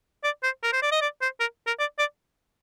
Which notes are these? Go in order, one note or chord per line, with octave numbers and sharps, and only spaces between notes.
D5
C5
A#4
C5
D5
D#5
D5
C5
A#4
A#4
D5
D5